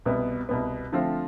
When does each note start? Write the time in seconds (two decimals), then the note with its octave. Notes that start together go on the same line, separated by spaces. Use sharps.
0.05 C2 B2 B3
0.49 C2 B2 B3
0.92 D3 F3 A3 C4 F4